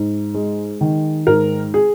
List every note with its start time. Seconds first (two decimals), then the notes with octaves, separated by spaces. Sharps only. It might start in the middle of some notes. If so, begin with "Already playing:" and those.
Already playing: G#2
0.35 G#3
0.81 D#3
1.27 G#2 A#4
1.74 G#4